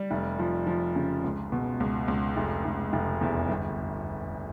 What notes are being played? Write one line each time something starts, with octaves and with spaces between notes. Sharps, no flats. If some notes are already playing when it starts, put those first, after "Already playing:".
Already playing: G3
F1
F3
F3
C#3
C#2
B2
C#2
C#2
F1
F1
F1
E2
G1